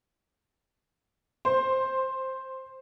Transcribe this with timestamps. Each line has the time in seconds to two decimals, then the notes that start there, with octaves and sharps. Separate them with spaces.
1.45 C5